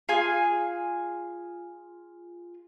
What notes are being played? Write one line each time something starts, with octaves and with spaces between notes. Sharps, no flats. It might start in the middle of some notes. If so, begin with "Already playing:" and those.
F4 G#4 G#5